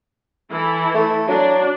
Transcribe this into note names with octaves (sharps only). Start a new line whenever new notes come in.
E3 E4 A4
A3
F#3 D4